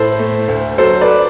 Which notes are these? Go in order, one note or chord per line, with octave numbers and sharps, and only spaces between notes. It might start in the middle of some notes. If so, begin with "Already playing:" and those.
Already playing: A2 A4 C5
A3
D2
F#3 A4 C5
B4 D5